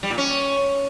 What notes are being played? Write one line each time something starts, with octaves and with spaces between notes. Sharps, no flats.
G3
A#2
C#4